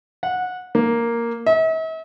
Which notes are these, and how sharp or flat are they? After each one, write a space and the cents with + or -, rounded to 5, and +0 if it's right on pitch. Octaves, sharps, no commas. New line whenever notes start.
F#5 -20
A#3 +0
E5 -45